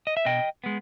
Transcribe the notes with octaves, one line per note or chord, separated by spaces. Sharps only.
D#5
E5
B2 D#5 G5
G#3 B3